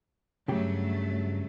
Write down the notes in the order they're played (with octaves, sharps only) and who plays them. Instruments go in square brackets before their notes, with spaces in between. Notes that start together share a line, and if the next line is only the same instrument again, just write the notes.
[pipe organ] G2 [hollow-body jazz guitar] C#3 G4 [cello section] F#3 A3